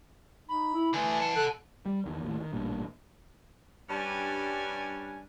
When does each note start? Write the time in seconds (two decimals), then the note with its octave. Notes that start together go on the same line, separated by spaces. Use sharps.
0.49 D#4 B5
0.74 E4
0.93 D3 E3 A3 G#5
1.20 F#5 A5
1.36 A4 F#6
1.86 G3
2.06 E2 D#3
2.23 D#2 A2
2.40 D#3
2.53 A1 G2 A#2
3.90 G2 G3 C#4 D4 G#5